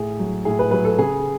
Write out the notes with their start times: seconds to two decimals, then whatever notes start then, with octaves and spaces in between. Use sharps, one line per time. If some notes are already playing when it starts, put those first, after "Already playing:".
Already playing: A2 G#4
0.19 F#3
0.45 A2 G#4
0.59 B4
0.71 F#3 B4
0.85 A4
0.98 C#3 G#4